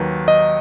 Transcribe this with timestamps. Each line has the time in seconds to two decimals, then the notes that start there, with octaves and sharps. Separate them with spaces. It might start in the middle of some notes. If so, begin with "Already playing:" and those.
Already playing: D#2 D#3 F#3 B4
0.28 D#5